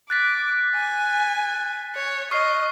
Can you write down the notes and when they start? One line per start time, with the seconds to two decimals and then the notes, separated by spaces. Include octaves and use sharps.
0.10 D6 F#6 A6 B6
0.75 G#5
1.96 C#5
2.31 D#5 C#6 F6 C7